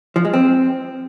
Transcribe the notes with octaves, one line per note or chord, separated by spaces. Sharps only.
F3
G#3
C4